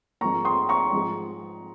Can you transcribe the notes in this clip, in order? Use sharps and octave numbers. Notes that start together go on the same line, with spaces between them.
G#2 F3 A#3 A#5 C#6
C6 D#6
A#5 C#6
G#2 F3 G#3